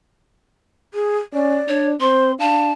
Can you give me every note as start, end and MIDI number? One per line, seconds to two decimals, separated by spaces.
0.94 1.18 68
1.34 1.61 61
1.34 1.87 74
1.68 1.95 62
1.68 1.89 73
2.00 2.34 60
2.00 2.32 72
2.00 2.34 84
2.39 2.72 62
2.39 2.69 77
2.39 2.72 81